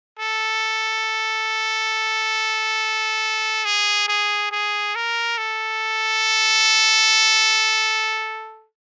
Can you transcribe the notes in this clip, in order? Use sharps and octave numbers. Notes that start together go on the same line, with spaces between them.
A4
G#4
G#4
G#4
A#4
A4